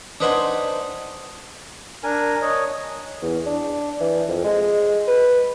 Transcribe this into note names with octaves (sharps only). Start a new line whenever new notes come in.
D4 D#4 B4 C5 F#5 G#5
D4 A#4 G#5
C#5 D#5
E2
D4
E3
F2
G#3
B4